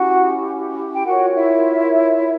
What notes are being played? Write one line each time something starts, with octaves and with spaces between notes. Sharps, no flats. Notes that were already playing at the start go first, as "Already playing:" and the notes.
Already playing: C#4 E4 F#4 G4 F#5
G5
F4 F#4 A#4 C#5 F#5
E4 E5